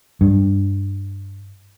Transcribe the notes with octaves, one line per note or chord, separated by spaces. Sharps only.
G2